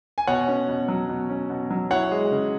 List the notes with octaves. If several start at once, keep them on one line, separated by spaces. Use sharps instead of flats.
G#5
B2 C#5 F#5
C#4
B2
F#3
B2
C#4
B2
F#3
E4 C#5 F#5
G#3
C#3